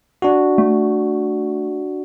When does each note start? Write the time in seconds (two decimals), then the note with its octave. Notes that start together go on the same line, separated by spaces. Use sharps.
0.22 D4 F#4
0.58 A3